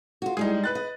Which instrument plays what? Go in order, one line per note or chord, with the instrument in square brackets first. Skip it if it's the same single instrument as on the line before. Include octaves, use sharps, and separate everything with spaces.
[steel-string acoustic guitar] F4 F#4
[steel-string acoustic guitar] A2 G3 G#3 [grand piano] D#4 G#4
[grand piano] B4 F#6 A6
[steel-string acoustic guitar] D#5